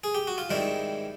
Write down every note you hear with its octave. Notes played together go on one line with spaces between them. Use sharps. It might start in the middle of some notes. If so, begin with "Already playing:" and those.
G#4
G4
F#4
F4
G#2 D#3 G3 C4 E4